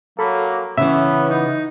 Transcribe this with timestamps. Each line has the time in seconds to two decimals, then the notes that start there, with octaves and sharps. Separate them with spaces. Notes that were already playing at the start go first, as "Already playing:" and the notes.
0.19 F#3 A#3 A4 B5
0.78 C#3 E3 B3 C#4 E5
1.30 D#4